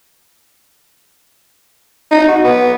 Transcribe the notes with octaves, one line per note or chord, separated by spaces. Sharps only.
D#4
F#4
B3